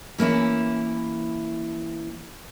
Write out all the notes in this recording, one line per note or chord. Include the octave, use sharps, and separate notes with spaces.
E3 A#3 C#4 E4